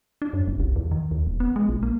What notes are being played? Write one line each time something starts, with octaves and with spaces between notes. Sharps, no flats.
D4
F#2
F#1
C2
E2
D#3
D#2
E1
B3
G#3
A#1
A#3